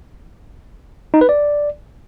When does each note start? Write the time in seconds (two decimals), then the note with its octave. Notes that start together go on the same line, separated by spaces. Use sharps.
1.14 D#4
1.21 B4
1.29 D5